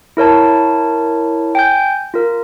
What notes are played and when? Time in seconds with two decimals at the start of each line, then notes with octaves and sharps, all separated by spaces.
0.17 E4 A#4 C#5 A5
1.55 G5 G#5 G6
2.14 F4 A#4